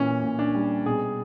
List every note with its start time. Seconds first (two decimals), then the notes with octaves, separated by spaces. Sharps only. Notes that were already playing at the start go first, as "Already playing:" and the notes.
Already playing: A#2 E3 C#4
0.24 A#2
0.39 D4
0.55 G3
0.86 B2 G#4